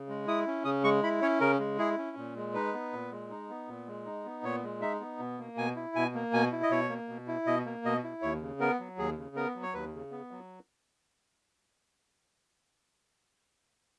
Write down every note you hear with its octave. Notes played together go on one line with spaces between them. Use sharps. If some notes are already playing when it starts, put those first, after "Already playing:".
Already playing: C#3
G#3
E4 D#6
C#4
C#3 D#6
G#3 C#6
E4 B5
C#4 C#5
C#3 A#4
G#3
E4 G#4
C#4
A#2
G#3
D#4 B4
B3
A#2
G#3
D#4
B3
A#2
G#3
D#4
B3
A#2 C#5
G#3
D#4 E5
B3
B2
A#3
B2 G#5
E4
B2 G#5
A#3
B2 G#5
E4
D#5
B2 C#5
A#3
B2
E4
B2 D#5
A#3
B2 D#5
E4
D#2 C#5
C#3
B3 A#4
F#3
D#2 G#4
C#3
B3 A#4
F#3
C#5
D#2 B4
C#3
B3
F#3